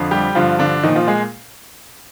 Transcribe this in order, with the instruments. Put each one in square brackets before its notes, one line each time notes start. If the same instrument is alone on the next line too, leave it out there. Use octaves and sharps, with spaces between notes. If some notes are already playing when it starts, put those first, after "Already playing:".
Already playing: [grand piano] F2 D3 F3
G3 G4
G2 D3 F3 F4
D3 D4
D#3 F3 D#4
A#2
F3 F4
G#3 G#4